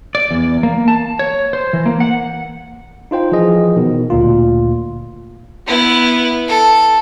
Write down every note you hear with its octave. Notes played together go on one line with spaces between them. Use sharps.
D5
E2
A#3
A5
C#5
C5
E3
A#3
F#5
D#4 F4 C5 G5
E3 F3 G#4 D#5
B2 D#3
D2 A#2 F4
B3 E4
A4